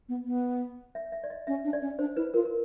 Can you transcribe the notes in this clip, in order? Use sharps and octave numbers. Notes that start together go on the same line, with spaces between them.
B3
B3
E5
E5
D5
D#5
C#4 E5
D4
D5
C#4
D4 C5
E4 B4
F4 A#4
A#4